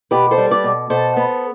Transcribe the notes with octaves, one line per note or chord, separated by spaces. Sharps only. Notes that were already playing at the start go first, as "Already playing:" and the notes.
B2 G4 B4
A4 C5
G3
B4 D5
B2
B2 A4 C5
B3